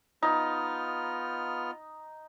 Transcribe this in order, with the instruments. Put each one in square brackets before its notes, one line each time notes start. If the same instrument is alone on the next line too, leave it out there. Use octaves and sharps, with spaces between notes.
[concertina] B3 F4 F6 [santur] D#4